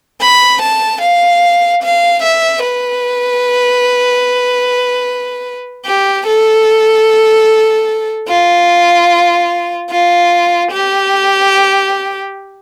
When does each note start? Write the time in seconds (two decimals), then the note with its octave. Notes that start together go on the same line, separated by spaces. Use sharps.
0.22 B5
0.62 A5
1.02 F5
1.83 F5
2.23 E5
2.63 B4
5.86 G4
6.27 A4
8.28 F4
9.91 F4
10.72 G4